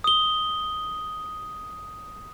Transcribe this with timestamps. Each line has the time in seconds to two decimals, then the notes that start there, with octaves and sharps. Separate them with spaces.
0.04 D#6 G7